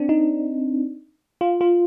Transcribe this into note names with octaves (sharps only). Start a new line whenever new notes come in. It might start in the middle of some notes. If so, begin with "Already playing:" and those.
Already playing: C4 D4
D#4
F4
F4